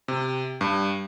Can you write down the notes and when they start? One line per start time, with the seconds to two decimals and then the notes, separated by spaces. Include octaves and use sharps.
0.08 C3
0.61 G2